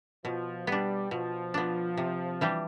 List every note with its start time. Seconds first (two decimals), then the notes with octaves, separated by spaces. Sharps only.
0.25 B2 F3
0.67 G3 B3 D4
1.11 B2 F3
1.54 B3 D4
1.97 C3
2.41 E3 G3 D4 G4